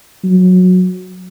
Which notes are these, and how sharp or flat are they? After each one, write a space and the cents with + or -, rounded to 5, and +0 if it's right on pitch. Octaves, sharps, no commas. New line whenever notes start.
F#3 -15